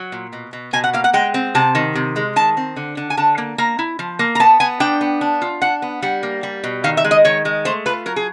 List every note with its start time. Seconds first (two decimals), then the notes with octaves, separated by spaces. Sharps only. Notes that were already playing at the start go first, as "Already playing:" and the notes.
Already playing: F#3
0.12 A#2
0.33 B2
0.53 B2
0.73 B2 G#5
0.84 F#5
0.93 A#3 F5
1.04 F#5
1.13 G#3 G5
1.34 C4
1.55 C3 A5
1.75 D#3
1.95 C3
2.16 G#3
2.36 D#3 A5
2.57 C4
2.76 D3
2.97 D3
3.10 G#5
3.17 D3 A5
3.38 A#3
3.58 A#3 A#5
3.79 E4
3.99 F3
4.19 A#3
4.35 A#5
4.40 B3 A5
4.60 B3 G#5
4.80 D4 G5
5.01 B3
5.21 D4
5.42 F4
5.62 D4 F#5
5.82 B3
6.02 G3 F#5
6.23 A#3
6.43 G3
6.64 B2
6.84 D#3 F5
6.97 E5
7.04 G#3
7.11 D#5
7.25 D#3 C#5
7.45 G#3
7.65 A3 C5
7.86 F4 B4
8.06 F#3 A#4
8.16 G#4